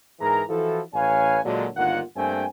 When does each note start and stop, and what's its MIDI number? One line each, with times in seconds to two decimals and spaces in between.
0.20 0.43 44
0.20 0.43 52
0.20 0.43 68
0.20 0.43 70
0.20 0.43 82
0.49 0.81 52
0.49 0.81 53
0.49 0.81 64
0.49 0.81 66
0.49 0.81 69
0.94 1.40 33
0.94 1.40 61
0.94 1.40 71
0.94 1.40 73
0.94 1.40 77
0.94 1.40 80
1.45 1.66 46
1.45 1.66 50
1.45 1.66 54
1.45 1.66 56
1.76 2.01 31
1.76 2.01 38
1.76 2.01 51
1.76 2.01 58
1.76 2.01 65
1.76 2.01 78
2.16 2.45 43
2.16 2.45 57
2.16 2.45 58
2.16 2.45 60
2.16 2.45 79
2.16 2.45 80